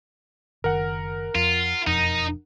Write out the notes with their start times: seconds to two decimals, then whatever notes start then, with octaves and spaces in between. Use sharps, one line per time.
0.64 F#1 D#3 A#4 F#5
1.35 F2 F4
1.87 E1 F2 D#4